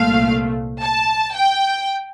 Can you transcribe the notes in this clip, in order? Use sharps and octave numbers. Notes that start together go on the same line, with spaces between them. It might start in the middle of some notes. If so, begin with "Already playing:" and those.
Already playing: C2 A#2 A3 F5
A5
G5